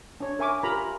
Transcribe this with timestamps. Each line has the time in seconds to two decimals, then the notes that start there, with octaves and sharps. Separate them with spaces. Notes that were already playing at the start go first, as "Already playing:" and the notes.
0.20 D4 C#5
0.39 A#4 E5 G#5 C#6 D6
0.63 F4 G4 A#4 A#5 B5